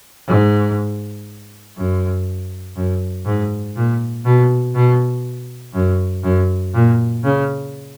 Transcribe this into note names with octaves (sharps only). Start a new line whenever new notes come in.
G#2
F#2
F#2
G#2
A#2
B2
B2
F#2
F#2
A#2
C#3